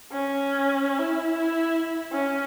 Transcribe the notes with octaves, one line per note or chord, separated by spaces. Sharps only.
C#4
E4
C#4